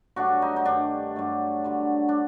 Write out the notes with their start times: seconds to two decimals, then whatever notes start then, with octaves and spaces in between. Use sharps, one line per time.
0.16 G2 F#3 A3 D4 F#4
0.42 D#4
0.56 D#4
0.65 G2 D#3 G3 D4
1.16 G2 F#3 A3
1.64 G2 D3 F#3
2.09 D4